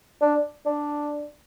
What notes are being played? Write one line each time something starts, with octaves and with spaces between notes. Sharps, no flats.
D4
D4